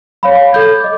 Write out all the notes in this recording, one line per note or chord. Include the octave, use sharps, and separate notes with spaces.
C#5 F5 B5
A4 G6 G#6
D#5 D6